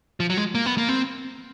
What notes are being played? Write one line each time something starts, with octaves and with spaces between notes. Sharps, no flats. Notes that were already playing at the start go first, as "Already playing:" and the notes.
F3
F#3
G#3
A#3
B3
A#3
C4